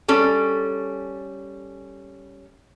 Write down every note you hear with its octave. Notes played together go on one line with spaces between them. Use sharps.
G3 C#4 A4